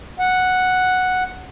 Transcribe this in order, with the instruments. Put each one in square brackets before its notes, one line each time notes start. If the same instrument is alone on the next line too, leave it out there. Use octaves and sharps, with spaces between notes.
[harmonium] F#5